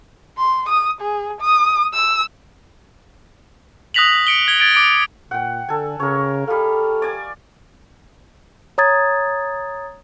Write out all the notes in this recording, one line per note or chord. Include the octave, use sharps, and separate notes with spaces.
C6
D#6
G#4
D#6
E6
D#6 F#6 A#6 B6 F7 F#7
C#7 D7 G7
G#6 G7
G#6 A6 D7
D6 D7
A#2 F#5 G5
D3 A4 G#5
C#3 A#4 C#5
G3 A4 D#5 F5
D5 G#5
C#5 A#5 D#6 G#6 A6